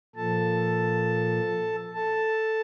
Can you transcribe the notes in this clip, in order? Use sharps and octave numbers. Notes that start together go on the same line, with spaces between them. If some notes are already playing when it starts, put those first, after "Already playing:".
A#2 F3 A4 A5
A4 A5